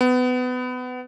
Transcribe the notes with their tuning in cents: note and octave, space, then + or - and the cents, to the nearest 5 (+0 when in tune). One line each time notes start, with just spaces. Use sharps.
B3 +25